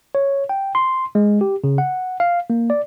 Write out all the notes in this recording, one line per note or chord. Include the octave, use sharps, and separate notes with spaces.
C#5
G5
C6
G#3
G4
C#3
F#5
F5
A#3
D5